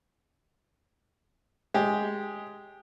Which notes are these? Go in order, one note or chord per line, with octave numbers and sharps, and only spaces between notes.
G#3 G4